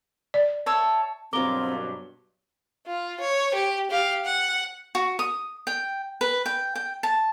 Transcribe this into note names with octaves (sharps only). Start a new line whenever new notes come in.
D5
C#5 E5 A5
G2 B2 F#3 C4 F4 A#4 D6 G7
F4
C#5
G4
G4 F5
F#5
F#4
D#6
G5
B4
G5
G5
A5